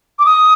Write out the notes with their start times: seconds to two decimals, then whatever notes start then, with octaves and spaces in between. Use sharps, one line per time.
0.19 D6
0.26 D#6